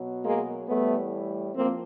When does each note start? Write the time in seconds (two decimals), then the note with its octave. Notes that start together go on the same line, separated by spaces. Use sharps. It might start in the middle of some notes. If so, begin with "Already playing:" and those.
Already playing: B2 F#3
0.24 G#3 A#3
0.68 A2 E3 G3 A3 B3
1.54 F3 A#3 C4